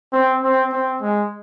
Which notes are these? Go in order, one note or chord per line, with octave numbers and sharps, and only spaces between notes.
C4
C4
C4
G#3